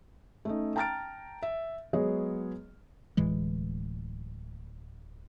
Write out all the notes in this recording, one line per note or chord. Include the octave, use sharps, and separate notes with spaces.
A3 C#4 D#4
G5 A5 A#5 F6 A6 D7
E5
F#3 G#3 B3 G#4 C#5 D#5
D1 A2 E3 G#3